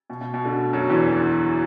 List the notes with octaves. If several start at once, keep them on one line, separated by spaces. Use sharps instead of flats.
B2
B2
B2
D2 D3
F#2 F#3
E2 E3